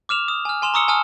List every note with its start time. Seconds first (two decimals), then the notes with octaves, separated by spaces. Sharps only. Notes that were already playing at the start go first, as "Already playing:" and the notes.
0.09 D6 F6 E7 F7
0.28 D#6
0.45 G#5 F6
0.62 G#5 C6 E7 F7
0.74 A#5 C#6 D#6 E6 C#7 G7
0.88 G#5 A5 D#6 F6